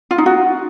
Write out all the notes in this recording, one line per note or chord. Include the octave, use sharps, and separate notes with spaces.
F4
D#4
F#4